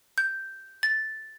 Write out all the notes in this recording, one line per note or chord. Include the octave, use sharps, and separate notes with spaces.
G6
A6